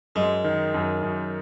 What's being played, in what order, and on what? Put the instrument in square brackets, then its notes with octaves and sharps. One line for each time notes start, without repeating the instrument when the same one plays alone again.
[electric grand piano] F#2 [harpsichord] G#3
[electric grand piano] D#3
F#2
F#2